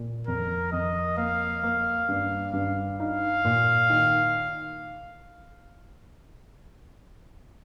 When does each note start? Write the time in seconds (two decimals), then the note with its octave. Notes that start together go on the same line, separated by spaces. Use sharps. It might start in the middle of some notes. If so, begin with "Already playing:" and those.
Already playing: A#2
0.27 F2 A#4
0.72 F2 D#5
1.17 A#3 F5
1.63 A#3
2.08 G2
2.53 G2
3.00 D#4 F5
3.45 A#2
3.90 D#3